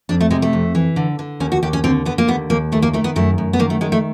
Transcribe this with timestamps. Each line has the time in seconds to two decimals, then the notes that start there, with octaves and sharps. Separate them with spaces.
0.09 F2 D4
0.21 A3
0.30 C3 G#3
0.42 A3
0.53 F2
0.75 E3
0.96 D3
1.19 D3
1.40 D#2 C#4
1.52 F#4
1.63 D#2 G4
1.73 C#4
1.84 D3 C4
2.05 D3 B3
2.18 A#3
2.28 D#2 B3
2.50 D#2 A#3
2.72 D#3 A3
2.82 A#3
2.93 D#3 A3
3.04 B3
3.16 F#2 A3
3.38 F#2
3.53 B3
3.59 D#3 A#3
3.70 A3
3.81 D#3 G#3
3.92 A3